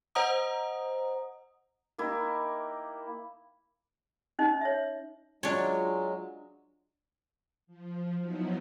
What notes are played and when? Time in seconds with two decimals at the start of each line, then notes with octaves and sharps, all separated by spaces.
0.15 C5 D#5 F#5 A#5 D#6
1.98 A#3 D#4 E4 G4
4.39 C#4 D#4 D#5
4.61 C#5 E5
5.43 F#3 G#3 D4 F4 C#5
7.67 F3
8.18 F3 F#3 B3 D#4 E4